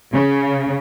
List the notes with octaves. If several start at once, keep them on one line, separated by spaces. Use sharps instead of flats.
C#3